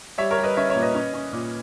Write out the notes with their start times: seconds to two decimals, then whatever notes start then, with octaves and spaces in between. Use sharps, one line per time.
0.18 G3 C#5 E5
0.31 A#4 C#5
0.38 G3
0.43 B4 D#5
0.56 C#4 C#5 E5
0.70 C#5 E5
0.75 A#2
0.82 B4 D#5
0.95 C#4
1.14 C#4
1.33 A#2